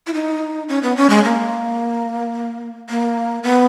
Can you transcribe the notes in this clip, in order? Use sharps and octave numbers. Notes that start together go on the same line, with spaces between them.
E4
D#4
C#4
B3
C#4
G#3
A#3
A#3
B3